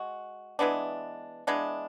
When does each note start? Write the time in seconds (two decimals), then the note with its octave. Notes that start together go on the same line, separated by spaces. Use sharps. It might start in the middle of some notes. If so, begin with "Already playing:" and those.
Already playing: G#3 F#4
0.59 E3 G#3 B3 D4
1.47 E3 G#3 B3 D4